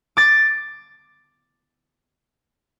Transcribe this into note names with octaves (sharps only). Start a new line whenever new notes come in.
D6 A6